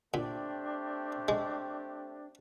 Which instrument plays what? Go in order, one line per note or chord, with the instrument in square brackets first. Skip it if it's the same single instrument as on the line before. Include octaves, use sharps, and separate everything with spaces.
[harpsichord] A#2 [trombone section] A3 C4 G4 [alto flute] D4
[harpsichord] G#3